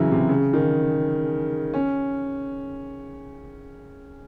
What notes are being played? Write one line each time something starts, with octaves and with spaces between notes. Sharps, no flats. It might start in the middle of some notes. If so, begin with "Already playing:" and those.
Already playing: C#3 E3 F#3 E4
C3
C#3
D#3
C#4